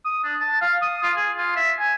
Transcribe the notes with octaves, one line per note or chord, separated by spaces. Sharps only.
D#6
D4
A5
F5
D#6
F4
G#4
F4
E5
G#5